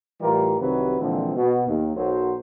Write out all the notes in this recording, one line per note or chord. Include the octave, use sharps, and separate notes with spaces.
A2 E3 G3 F4 G4 A#4
C2 C3 D#3 F#3 C4 B4
A#2 D3 E3 F3 G#3 C4
B2
D#2
B1 F#3 A#4 C5